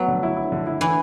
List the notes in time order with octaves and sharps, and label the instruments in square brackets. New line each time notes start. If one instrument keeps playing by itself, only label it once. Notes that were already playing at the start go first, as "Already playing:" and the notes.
Already playing: [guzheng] F#3 A3 [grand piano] B3
[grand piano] D3
E4
E4
D3
E4
[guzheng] E3 [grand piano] E4